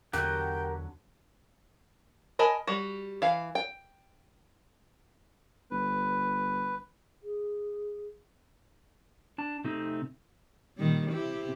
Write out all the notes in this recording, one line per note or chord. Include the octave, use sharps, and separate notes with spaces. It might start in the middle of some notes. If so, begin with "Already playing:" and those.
E2 D3 F#3 C4 G4 A#4 F#5 G5
A#4 D#5 G#5 A5 B5
G3 F#4
E3 F5
G5
G1 B4
G#4
D4 A5
C3 A3 C4 D#4
A#2 D#3 G3
C3 E4 G4